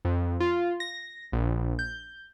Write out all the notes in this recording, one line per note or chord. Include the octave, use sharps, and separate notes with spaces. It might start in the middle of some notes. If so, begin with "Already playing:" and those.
F2
F4
A#6
A#1
G6